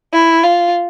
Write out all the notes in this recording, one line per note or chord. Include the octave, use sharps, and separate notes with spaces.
E4
F4